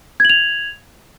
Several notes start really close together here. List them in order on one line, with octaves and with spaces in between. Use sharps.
G#6 F#7 F7